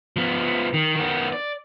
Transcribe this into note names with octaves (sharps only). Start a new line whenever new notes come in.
F3 B3
D#3
D#3 B3
D5